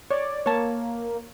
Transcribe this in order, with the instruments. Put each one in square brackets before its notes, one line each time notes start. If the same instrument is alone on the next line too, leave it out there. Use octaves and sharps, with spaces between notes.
[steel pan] C#5 [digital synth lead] D5
[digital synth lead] A#3 [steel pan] C#5 A5